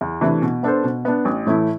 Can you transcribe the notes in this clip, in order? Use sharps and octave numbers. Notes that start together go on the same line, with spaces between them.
E2
C3 E3 A3 D4
B2
B3 D4 A4 C5
B2
B3 D4
A1
A2 E3 A3 E4